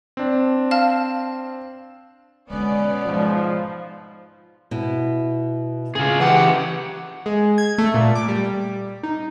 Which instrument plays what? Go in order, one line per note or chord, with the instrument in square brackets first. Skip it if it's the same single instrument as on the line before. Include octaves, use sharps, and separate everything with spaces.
[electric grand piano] C4 D4
[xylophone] F5 A5 F6
[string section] B2 C#4 D5 [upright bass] D3 G#3 [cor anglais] B3
[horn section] G#2 F3 [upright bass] G#3
[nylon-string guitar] B2 E4
[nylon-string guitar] C#3 [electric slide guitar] F4 G#4
[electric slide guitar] E3 G4 [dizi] F#5
[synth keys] G#3
G#6
A3
A#2
D6
G3
D#4